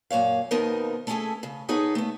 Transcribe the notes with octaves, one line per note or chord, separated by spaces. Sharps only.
F#2 A#2 C#5 F5
D#2 B2 B3 D#4 A#4 C5
A3 C#4 E4 F4 G#4 A4
C#3
B3 D#4 G#4 A4 B4 C#5
A3 B3